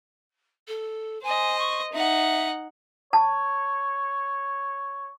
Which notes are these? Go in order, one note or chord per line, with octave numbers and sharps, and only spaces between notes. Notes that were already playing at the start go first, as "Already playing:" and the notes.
A4
C5 D#5 G#5
C#6
D#4 E5 F#5
C#5 A5